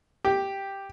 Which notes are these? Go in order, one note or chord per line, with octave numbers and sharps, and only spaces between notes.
G4